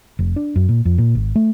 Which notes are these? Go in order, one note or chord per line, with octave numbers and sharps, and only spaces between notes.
F1
D4
F#2
A#2
F2
A#2
G#1
A3